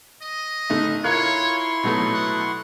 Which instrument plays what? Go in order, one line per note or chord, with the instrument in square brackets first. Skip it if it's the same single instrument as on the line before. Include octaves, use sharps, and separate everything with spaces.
[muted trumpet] D#5
[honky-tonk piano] F#1 A3 D#4
[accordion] E4 C6 C#6 [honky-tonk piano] F4 A#4 F#6 [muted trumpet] C#5
[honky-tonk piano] B2 F#3 A3 [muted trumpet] D#4
[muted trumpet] F#5